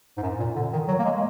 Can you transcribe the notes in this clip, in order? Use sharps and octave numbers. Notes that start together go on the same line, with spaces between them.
G#2
F#2
A#2
D3
D#3
F#3
A#3
G#3